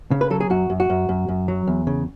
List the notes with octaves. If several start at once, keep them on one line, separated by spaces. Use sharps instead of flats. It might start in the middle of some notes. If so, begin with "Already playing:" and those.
C#3
B4
F#3 A4
G#4
F#2 F#4
F#2
F#4
F#2
F#2
F#2
F#3
E2
C#3